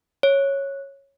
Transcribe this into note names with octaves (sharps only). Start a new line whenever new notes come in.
C#5